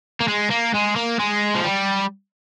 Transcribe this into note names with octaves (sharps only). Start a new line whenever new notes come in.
A#3
G#3
A#3
G#3
A#3
G#3
F3
G3